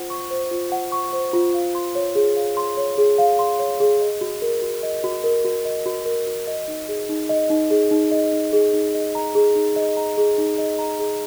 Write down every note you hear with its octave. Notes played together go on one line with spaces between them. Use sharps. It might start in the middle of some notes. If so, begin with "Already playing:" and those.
Already playing: F4 C5 F#5
C#6
C5
F4
F#5
C#6
C5
F4
F5
C6
C#5
G#4
F5
C6
C#5
G#4
F5
C6
C#5
G#4
D#5
F#4
A#4
F#4
D#5
F#4
A#4
F#4
D#5
F#4
A#4
F#4
D#5
D#4
G#4
D#4
D#5
D#4
G#4
D#4
D#5
D#4
G#4
D#4
D#5
A#5
G#4
D#4
D#5
A#5
G#4
D#4
D#5
A#5
G#4